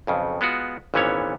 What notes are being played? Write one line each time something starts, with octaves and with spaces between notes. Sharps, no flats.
B1 F2 C#3
G#3 B3 F4 F#4
G#1 A#2 E3 B3 C#4 C#5